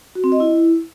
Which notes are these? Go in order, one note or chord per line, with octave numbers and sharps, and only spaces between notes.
F#4
C4
D#5
E4